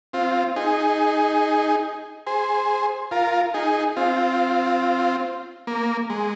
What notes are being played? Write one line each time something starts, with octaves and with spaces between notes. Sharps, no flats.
C4 F4
D#4 G#4
G#4 C5
F4 A#4
D#4 G#4
C4 F4
A#3
G#3